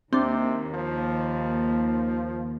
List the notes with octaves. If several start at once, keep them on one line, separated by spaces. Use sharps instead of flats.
D#2 C3 C4 D4
F3